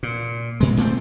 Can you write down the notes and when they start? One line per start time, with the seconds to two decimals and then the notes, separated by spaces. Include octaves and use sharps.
0.03 A#2
0.61 A#2 G#3
0.77 A#2 A3 B3 C4